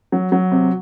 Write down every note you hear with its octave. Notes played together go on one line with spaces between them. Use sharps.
F#3
F#3
C3